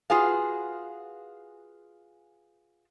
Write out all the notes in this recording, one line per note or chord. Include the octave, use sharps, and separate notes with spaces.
F4 F#4 G#4 B4 F5